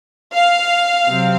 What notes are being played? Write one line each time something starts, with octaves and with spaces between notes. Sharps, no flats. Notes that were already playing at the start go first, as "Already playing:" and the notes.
F5
C3 F#3 C4